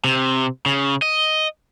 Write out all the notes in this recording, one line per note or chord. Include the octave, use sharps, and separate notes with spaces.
C3
C#3
D#5